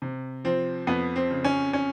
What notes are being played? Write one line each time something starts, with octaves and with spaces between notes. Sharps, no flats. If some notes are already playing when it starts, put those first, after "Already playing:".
C3
F3 C4
F2 B3
C4
C#3
C#4
C#4